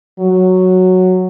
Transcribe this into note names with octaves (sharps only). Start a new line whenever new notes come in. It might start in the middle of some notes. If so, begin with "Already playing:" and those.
F#3